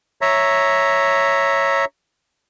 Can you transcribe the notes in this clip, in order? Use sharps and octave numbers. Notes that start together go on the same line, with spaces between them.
C#5 E5 A#5